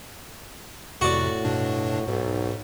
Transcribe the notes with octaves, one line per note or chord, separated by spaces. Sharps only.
F2 A2 C3 F#4 D5
G2 B2 D4
B1 G#2